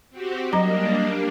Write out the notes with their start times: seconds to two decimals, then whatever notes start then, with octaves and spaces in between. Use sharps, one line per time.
0.10 C4 F#4 G4
0.53 F#3 G3 A#3 D4 D#5 A#5